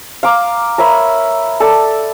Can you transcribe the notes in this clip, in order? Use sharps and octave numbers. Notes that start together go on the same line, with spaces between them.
F5 A#5 D6
A#4 C#5 E5 B5
A4 D5 A5